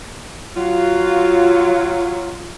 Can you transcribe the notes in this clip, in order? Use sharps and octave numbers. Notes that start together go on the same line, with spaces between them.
F#3 F4